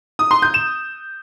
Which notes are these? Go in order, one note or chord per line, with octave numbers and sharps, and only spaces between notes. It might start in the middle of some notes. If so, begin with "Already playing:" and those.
D#6
C6
G6
E7